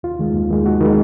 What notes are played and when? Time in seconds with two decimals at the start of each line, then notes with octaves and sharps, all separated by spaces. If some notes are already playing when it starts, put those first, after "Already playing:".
0.03 D#2 F4
0.19 D#3 G#3
0.34 D#2
0.50 D#3 G#3
0.66 D#2 F#4
0.81 D#3 G#3